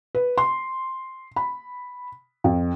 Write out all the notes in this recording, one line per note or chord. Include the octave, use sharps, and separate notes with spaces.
B4
C6
B5
F2